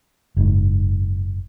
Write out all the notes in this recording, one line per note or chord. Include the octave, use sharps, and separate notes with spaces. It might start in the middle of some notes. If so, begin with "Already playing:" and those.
F#1 G#2